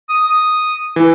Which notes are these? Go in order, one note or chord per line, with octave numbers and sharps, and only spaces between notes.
D#6
D#6
E3